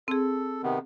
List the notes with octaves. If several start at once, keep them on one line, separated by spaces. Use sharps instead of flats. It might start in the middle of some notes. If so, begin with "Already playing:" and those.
C4 G#4 A4
C3 D#3 B3